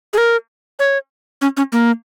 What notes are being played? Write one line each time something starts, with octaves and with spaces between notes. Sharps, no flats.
G#4
A#4
C#5
C#4
C#4
A#3